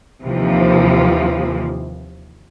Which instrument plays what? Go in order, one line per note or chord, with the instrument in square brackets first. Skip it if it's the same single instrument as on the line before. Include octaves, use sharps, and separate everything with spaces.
[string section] D#2 C3 E3 F3